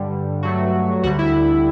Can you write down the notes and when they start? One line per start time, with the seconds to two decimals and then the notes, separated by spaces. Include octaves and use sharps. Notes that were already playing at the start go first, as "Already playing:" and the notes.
Already playing: G2 D3 G3
0.43 G2 F#3 A3 F#4
1.03 D2 D3 G3 F#4
1.19 E4